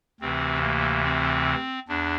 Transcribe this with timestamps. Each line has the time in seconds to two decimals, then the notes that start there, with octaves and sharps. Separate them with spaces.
0.21 D2 C3 E3 C4
0.63 A#3
1.04 C4
1.88 E2 D4